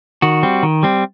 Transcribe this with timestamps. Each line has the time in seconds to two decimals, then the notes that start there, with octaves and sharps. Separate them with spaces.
0.22 D#3 F#4
0.43 G3 C4
0.63 D#3
0.83 G3 C4